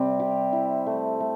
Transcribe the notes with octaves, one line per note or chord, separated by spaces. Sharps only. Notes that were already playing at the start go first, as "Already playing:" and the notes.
Already playing: C3 G3 C4
G4
E4
A3
A3